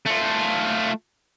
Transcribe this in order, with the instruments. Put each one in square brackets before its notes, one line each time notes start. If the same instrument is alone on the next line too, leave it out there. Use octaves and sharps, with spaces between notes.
[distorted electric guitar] A3 F4